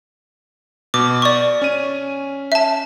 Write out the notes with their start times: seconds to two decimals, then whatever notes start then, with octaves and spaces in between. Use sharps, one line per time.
0.94 B2 D6
1.22 D5 C#6
1.62 C#4 D#7
2.52 E5 A5